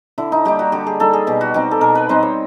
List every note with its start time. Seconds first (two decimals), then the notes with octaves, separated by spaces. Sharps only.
0.18 D3 E4
0.32 D#4
0.45 G3 A#3 D#4 G4
0.59 F#4
0.72 D3 G4
0.87 G#4
1.00 G3 A#3 D#4 A4
1.13 G#4
1.27 B2 G4
1.41 F#4
1.54 G3 C4 D#4 G4
1.71 A4
1.81 B2 A#4
1.95 B4
2.09 G3 C4 D#4 C5
2.23 C#5